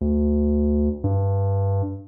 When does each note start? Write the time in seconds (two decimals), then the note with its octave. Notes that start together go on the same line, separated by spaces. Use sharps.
0.01 D2
1.04 G2